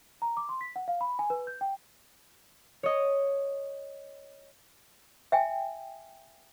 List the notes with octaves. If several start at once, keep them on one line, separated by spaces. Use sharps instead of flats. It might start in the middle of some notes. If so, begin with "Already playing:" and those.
A#5
D6
C6
B6
F#5
F5
B5
G#5
B4
G6
G5
C#5 D#5
E5 G5 G#5